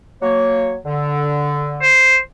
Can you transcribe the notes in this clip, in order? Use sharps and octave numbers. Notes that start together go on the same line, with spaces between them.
F#3 A#3 C#5
D3
C5